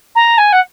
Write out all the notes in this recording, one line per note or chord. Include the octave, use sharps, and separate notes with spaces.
A#5
G#5
F#5